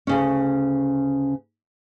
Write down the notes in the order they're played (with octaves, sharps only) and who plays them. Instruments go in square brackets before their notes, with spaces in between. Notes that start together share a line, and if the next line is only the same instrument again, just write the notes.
[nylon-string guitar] D2 C#3 C#4